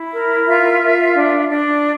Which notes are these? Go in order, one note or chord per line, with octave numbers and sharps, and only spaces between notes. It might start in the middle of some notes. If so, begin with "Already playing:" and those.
Already playing: E4
A#4
F4 E5
F4
D4
D4